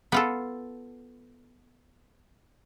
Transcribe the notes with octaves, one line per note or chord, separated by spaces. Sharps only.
B3 F4 A4